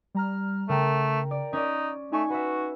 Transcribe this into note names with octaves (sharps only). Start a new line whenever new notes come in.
G3 A#5 F6
C#3 A3 A#4 G5 A#5
D5
C#4 D#4 D5
A3 D#4 G#5 C#6
F#4 B4 E5